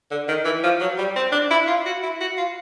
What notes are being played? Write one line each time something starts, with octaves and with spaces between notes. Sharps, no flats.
D3
D#3
E3
F3
F#3
G3
C4
D4
E4
F4
F#4
E4
F#4
F4